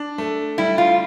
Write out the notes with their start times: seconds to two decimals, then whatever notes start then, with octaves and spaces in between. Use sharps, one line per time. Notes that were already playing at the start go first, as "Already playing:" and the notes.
Already playing: D4
0.18 A3
0.58 G3 E4
0.78 F4